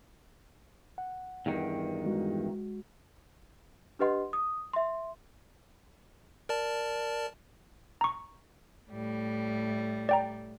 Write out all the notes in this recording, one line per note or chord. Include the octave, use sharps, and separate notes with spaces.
F#5
E2 G2 D#3
G#3 F#4
D4 G4 B4 D#5 F#5 C6
D#6
E5 C6
A#4 D5 A5
A#5 C#6
A2 G3
D5 G5 A#5